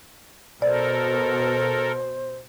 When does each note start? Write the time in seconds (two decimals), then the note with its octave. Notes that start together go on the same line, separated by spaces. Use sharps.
0.62 B2 A4 A#4 C5 D5